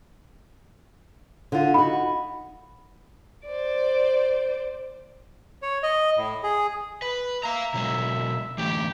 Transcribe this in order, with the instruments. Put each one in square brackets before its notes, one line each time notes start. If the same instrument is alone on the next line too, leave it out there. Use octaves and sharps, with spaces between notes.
[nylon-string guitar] D3 F4
[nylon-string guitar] D#4 F#4 [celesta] B5
[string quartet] C5 D5
[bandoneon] C#5
D#5
A2
G#4
[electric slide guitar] B4
[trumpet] E5 [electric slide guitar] F5 A#5
[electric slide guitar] B2 F#3 G#3
[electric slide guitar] D3 E3 A3 [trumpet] G4